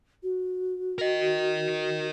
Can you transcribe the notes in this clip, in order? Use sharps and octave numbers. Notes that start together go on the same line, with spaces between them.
F#4
A#4 D#5